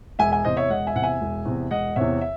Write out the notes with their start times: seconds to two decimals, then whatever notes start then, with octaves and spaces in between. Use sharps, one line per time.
0.19 E1 E5 G#5
0.32 E5 G#5
0.44 E2 C3 C5 D#5
0.57 C#5 E5
0.70 E1 D#5 F#5
0.87 E5 G#5
0.95 E2 C3 F#5
1.03 E5 G#5
1.21 E1
1.45 E2 C3
1.71 E1 D#5 F#5
1.96 E2 C3 C#5 E5
2.21 E5